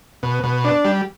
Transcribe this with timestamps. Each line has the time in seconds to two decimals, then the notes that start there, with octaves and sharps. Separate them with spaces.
0.23 B2
0.43 B2
0.64 D4
0.85 G3